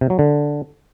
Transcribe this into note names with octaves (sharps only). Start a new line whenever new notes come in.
C3
F#3
D3